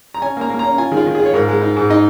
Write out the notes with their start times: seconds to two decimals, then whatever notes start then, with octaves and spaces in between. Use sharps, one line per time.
0.14 A#5
0.22 C#4 G#5
0.37 A#3
0.41 A#5
0.50 A#3
0.59 C#4 A#5
0.78 F4 G#5
0.91 D#3 G#4
0.97 F4
1.06 D#3
1.15 F4 G#4
1.26 C#5
1.33 G#2 A#4
1.48 G#3
1.62 D#4
1.76 G#2
1.90 D#4 D#5